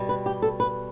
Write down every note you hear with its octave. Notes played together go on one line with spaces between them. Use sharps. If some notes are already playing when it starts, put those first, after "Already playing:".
Already playing: B2 G3
B4
G4
A4
B4